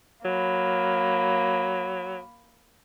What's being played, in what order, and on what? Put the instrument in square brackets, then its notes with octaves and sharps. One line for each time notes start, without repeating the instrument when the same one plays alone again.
[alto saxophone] F#3 [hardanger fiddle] A#3 B5